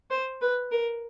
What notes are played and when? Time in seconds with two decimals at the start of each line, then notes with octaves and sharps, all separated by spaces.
0.10 C5
0.41 B4
0.72 A#4